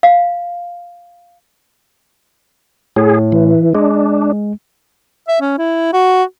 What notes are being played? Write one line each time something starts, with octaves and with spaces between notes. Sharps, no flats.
F5
A2 G#4
E3
G#3 D4
E5
C#4
E4
F#4